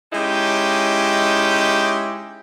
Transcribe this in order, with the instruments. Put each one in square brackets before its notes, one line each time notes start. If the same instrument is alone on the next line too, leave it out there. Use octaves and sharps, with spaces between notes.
[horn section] G#3 C#4 D#4 E4 G4